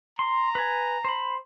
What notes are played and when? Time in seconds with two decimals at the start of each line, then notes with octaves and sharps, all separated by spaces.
0.19 A#5 C6
0.55 B4 G#5
1.05 C5 B5